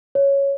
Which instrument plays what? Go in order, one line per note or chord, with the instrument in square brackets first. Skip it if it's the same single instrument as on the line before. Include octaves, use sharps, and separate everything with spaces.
[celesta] C#5